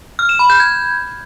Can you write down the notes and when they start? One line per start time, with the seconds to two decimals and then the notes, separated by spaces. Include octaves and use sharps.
0.19 F6
0.29 E7
0.39 B5
0.50 G6
0.60 G#6